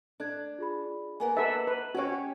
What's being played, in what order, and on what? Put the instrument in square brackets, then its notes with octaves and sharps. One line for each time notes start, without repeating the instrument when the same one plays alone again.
[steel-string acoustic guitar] D4 [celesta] A4 F#6 G#6
[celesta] F4 G#4 B5
[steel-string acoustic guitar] A#3 B3 A#4 [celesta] G#5
[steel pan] A4 B4 E5 [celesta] D#5 F#5
[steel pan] B4
[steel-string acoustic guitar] C#4 G4 [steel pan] F#4 C#5